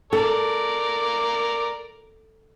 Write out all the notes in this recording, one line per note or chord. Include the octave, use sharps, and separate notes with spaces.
A4 A#4 D5